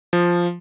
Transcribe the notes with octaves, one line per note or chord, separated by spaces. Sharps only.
F3